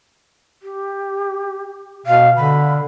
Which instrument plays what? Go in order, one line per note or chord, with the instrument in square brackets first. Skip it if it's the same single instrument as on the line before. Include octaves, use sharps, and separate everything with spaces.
[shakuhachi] G4
[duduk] B2 [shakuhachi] F5
[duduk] D3 [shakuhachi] B5